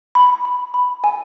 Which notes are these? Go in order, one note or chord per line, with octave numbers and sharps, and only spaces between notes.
B5
B5
B5
G#5